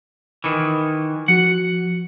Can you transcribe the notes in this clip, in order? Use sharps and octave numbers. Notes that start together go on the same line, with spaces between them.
D#3 E3
F3 F#4 F#5